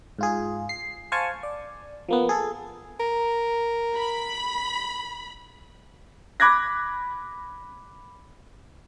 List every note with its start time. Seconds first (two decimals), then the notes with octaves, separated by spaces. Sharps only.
0.19 G#2 F4 G#4
0.69 C7
1.12 C5 F5 G#5 A5 C#6
1.43 D5
2.09 F3 A#3 B3
2.29 G#4 A4
3.00 A#4
3.97 B5
6.40 B5 D6 F#6 G#6 A#6